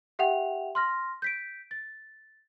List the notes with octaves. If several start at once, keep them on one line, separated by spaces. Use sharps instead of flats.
G4 E5 F#5 G5 F7
C6 F6 A#6
G6 B6 D7
A6